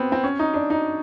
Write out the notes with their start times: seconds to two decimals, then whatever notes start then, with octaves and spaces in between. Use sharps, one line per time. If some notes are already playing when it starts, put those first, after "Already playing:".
Already playing: B3 C4
0.12 C4
0.24 C#4
0.39 D#4
0.54 D4
0.70 D#4